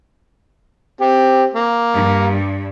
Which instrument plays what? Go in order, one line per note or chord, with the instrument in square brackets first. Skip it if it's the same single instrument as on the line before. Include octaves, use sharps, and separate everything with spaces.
[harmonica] C4 G4
A#3
[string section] G2